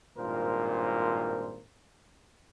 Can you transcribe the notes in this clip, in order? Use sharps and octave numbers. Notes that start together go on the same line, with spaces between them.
G#1 G2 A#2 F4 A#4 C5